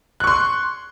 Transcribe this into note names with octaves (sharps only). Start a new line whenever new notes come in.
C6 C#6 F#6